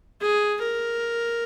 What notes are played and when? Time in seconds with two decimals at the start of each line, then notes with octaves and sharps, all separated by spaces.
0.21 G#4
0.61 A#4